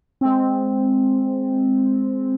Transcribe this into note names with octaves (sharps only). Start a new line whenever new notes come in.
G#3 C4